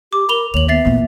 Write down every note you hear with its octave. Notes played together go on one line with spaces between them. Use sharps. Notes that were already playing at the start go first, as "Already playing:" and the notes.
G4 D6
A#4 B5 F7 G7
D#2 C#5 F7 F#7
B3 E5 A6 C7
E2 A#2